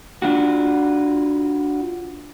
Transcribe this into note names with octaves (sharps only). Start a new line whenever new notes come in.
D4 F4 F#4